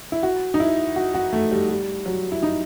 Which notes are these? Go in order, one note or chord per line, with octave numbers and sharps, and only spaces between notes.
E4
F#4
D#4
E4
F#4
F#4
A3
G3
G3
F#3
E4
D#4